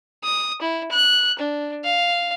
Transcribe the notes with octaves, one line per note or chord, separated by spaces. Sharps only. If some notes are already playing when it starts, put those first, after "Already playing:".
D#6
E4
F#6
D4
F5